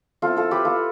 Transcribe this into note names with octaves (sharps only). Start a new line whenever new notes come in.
F3 C4 E4 F4 A4
F4 A4
G4 B4
F4 A4